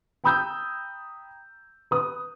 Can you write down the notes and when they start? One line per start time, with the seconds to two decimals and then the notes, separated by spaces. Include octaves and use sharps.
0.24 G5 A#5 B5 D#6 E6 G6
1.91 B4 D#6